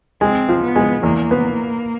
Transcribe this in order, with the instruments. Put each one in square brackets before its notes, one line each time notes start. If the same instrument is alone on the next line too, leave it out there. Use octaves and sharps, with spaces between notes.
[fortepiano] G#3 [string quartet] C4
[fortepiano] F3
[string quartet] B3
[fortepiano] G#3
[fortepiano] E2 [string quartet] A#3
[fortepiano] B3